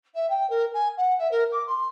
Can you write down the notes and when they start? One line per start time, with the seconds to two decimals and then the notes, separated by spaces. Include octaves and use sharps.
0.14 E5
0.29 G5
0.49 A#4
0.73 G#5
0.97 F#5
1.18 E5
1.31 A#4
1.51 D6
1.67 C6